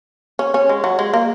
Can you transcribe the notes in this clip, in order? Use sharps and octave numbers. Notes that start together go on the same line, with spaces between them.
C#4
C#4
G#3
F#3
G#3
A#3